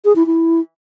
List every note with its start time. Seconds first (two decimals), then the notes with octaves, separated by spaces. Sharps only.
0.05 G#4
0.16 E4
0.27 E4